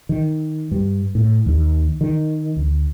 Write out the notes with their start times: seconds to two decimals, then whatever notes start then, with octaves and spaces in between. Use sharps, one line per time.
0.09 D#3
0.71 G2
1.15 A2
1.46 D#2
2.01 D#3
2.56 D2